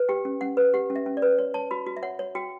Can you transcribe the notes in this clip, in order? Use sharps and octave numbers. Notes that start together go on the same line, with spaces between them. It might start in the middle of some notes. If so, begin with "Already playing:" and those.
Already playing: B4
G4 G5
C#4
C#4 F#5
B4
G4 F#5
C#4
E5
C#4
D5
B4
C#5
C#5 A5
F#4 B5
F#4
E5
C#5 F#5
C#5
F#4 G5